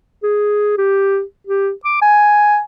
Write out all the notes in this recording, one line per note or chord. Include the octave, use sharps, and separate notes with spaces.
G#4
G4
G4
D6
G#5